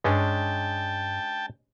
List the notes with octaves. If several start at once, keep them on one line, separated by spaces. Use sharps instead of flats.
G2 G#3 C#4 D4 G5 A5